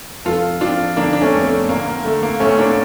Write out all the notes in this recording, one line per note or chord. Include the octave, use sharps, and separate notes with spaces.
F1 F4 A4
F2 D4 F4
D3 A#3 D4
D4
A3 C#4
F1
A3
D2 A#3
A#3
D3 A3
A#3
D2 A3 C#4
A#3 D4